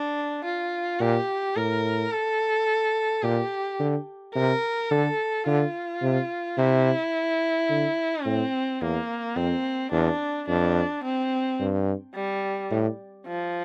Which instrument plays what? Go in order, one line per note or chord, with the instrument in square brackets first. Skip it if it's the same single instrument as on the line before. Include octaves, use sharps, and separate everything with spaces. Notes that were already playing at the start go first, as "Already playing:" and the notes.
Already playing: [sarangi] D4
F4
[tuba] A#2 [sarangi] G4
[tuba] A2 [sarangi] A#4
[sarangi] A4
[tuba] A#2 [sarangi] G4
[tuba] D3
[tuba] C3 [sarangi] A#4
[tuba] D3 [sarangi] A4
[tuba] D3 [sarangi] F4
[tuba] C3
[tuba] C3 [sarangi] E4
[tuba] D3
[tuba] A2 [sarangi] C4
[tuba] E2 [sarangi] A#3
[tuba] F2 [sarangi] C4
[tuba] E2 [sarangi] D4
[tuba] F2 [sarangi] D4
[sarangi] C4
[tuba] G2
[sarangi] G3
[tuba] A2
[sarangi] F3